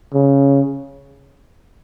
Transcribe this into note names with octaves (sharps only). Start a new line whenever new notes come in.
C#3